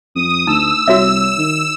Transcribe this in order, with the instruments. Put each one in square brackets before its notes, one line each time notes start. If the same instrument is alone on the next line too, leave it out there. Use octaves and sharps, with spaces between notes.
[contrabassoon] F2 [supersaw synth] D#6
[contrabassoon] D2 [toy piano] D#4 [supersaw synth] E6
[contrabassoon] C2 [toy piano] F#4 C#5 E5
[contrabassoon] D#3